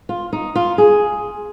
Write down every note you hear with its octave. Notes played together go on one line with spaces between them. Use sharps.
F4
D#4
F4
G#4